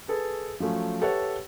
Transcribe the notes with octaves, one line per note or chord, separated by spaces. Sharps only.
G#4 A4 B4
F3 F#3 A3 C#4
G4 A4 B4 C#5 E5 F#5